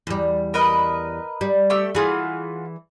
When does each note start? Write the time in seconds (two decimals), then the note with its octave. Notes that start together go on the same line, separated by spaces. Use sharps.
0.07 E2 G3
0.54 A#4 B4 D#5
1.41 G3
1.70 A3 G4 E6
1.95 E3 F4 F#4 G#4